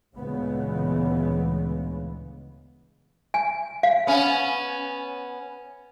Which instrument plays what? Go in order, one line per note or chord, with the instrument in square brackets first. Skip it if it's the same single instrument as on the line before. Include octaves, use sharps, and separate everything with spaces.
[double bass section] D2 A#2 C#3 E3 G#3 B3
[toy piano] G#5
F5
[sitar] B3 C#4